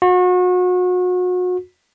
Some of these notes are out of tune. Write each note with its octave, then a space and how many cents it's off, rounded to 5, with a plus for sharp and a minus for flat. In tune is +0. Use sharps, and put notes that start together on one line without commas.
F#4 -35